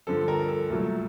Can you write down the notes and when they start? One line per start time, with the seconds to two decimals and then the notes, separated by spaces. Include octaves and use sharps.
0.07 G2 D3 F3 A4
0.28 A#4
0.48 A4
0.70 C2 A#2 F#3 A3